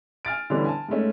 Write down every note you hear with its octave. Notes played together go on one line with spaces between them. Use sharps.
G#5 F6 A6 D7
D3 E3 G3 B3 C#4 D4
G#5 A5
G#2 G#3 A3 C#4